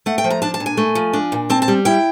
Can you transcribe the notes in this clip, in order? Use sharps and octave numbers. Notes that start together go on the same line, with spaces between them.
A3 F#5
G5
F3
A#5
D4 A5
A5
A#2
G#5
A3
F3
D4
A#2
C4 A5
A5
G3
E4 G5